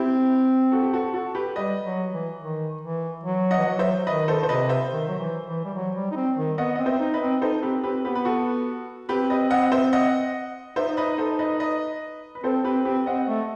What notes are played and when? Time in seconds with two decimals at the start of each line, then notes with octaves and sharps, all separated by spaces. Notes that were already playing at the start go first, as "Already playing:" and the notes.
Already playing: C4 E4 G4
0.72 F#4 A4
0.83 G4
0.93 F#4 A4
1.14 F#4 A4
1.35 G4 B4
1.56 G3 B4 D#5
1.84 F#3
2.12 E3
2.39 D#3
2.81 E3
3.24 F#3
3.51 D#5 F#5
3.57 E3
3.66 F#3
3.79 C5 E5
4.07 D#3 B4 D#5
4.28 A4 C5
4.43 C5
4.49 C3 B4 D#5
4.69 C5 E5
4.90 D#3
5.08 F#3
5.18 E3
5.46 E3
5.65 G3
5.75 F#3
5.95 G3
6.11 D#4
6.16 C4
6.37 D#3
6.57 B3 D#5 F#5
6.76 C4 D#5
6.86 C4 C5 E5
7.00 D#4
7.14 B4 D#5
7.21 C4
7.42 D#4 A4 C5
7.62 C4 G4 B4
7.84 C4 G4 B4
8.05 B3 G4 B4
8.15 B4
8.25 F#4 A4
9.09 C4 G4 B4
9.30 B4 D#5
9.51 D#5 F#5
9.72 C5 E5
9.93 D#5 F#5
10.76 D#4 C5 E5
10.97 B4 D#5
11.18 A4 C5
11.39 B4 D#5
11.60 B4 D#5
12.35 B4
12.43 C4 A4 C5
12.64 C4 G4 B4
12.85 C4 G4 B4
13.06 C4 D#5 F#5
13.27 A3